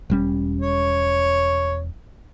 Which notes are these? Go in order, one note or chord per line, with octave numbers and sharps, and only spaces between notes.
E1 G3 C#4
C#5